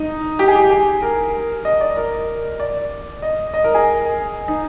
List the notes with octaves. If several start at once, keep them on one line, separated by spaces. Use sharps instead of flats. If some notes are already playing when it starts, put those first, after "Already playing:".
Already playing: D#4
G4
G#4
G4
G#4
A#4
D#5
D5
A#4
D5
D#5
D#5
A#4
G#4
D#4